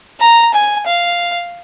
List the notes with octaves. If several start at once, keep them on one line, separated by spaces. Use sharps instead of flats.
A#5
G#5
F5